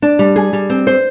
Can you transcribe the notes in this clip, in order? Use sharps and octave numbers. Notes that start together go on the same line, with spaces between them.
D4
G3
G#4
G3
C4
C5